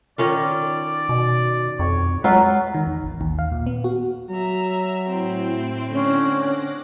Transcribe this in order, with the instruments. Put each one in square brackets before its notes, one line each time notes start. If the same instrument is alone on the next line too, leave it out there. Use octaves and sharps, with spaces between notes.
[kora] D#3 C#4 F4 [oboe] D5
[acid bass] B2
[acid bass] F2 [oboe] C#5
[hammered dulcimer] F#3 [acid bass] G#3 [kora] F4 [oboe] B4
[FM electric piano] D#3
E2
A1
D#2
F5
A#2
B3
F#4
[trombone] F#3 [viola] E5 A#5
[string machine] A2 E4 [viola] C4
[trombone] D3 [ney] C#4 [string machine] D6 F#6 A#6